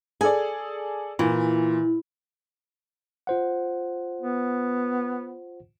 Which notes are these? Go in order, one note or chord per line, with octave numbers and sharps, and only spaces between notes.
G#4 A4 D5 G#5
A#2 E3
F4 C5 F#5
B3